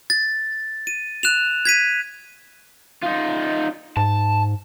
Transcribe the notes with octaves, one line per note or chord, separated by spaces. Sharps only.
A6
D#7
F#6 E7 F7
G#6 B6 D#7
D#4 F4
G#2 A5